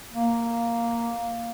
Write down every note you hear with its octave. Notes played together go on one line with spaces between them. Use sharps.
A#3